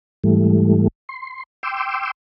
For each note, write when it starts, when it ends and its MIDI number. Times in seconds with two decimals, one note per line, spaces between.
0.24 0.88 44
0.24 0.88 52
0.24 0.88 55
0.24 0.88 57
1.09 1.43 84
1.63 2.11 79
1.63 2.11 84
1.63 2.11 86
1.63 2.11 88